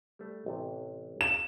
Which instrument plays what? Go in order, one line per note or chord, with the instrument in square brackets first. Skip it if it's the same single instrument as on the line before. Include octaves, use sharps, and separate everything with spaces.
[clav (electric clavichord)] G3 A3
A1 C3
[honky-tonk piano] E7